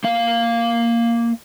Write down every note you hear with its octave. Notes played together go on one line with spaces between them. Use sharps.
A#3 F5